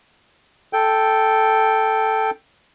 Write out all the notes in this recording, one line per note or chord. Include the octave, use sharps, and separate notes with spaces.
A4 G5